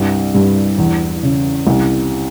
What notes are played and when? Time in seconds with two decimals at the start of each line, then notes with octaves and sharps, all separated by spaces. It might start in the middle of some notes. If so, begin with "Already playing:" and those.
Already playing: C2 G2
0.34 G2
0.78 E2
1.23 C#3
1.67 C2